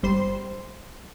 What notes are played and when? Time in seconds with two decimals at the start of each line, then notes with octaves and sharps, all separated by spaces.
0.03 G1 G3 C5 C6